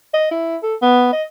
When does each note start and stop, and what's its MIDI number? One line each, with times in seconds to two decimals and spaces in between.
0.14 0.26 75
0.31 0.57 64
0.63 0.75 69
0.82 1.09 59
1.13 1.23 75